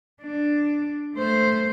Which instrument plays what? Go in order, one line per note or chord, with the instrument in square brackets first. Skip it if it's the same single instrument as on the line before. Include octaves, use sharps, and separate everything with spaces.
[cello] D4
A3 C5